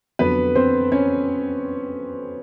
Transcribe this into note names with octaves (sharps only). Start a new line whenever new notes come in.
F2 D3 F#3 B3 B4
C4 C5
C#4 C#5